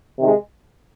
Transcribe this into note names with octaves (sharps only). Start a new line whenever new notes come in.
C3 D#3 G#3